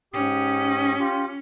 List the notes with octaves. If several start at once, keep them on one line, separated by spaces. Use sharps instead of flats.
G#2 C#4 G4 D#6
F4 G4